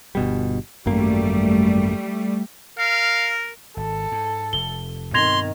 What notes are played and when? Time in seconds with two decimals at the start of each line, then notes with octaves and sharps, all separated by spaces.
0.15 G1 B2 G3
0.86 G#1 F#2 G3 A3 A#3
2.79 A#4 F5
3.77 G#1 A4
4.12 G#2
4.53 F1 G7
5.14 G2 B2 D#3 C4 C6 G#6 A#6 F7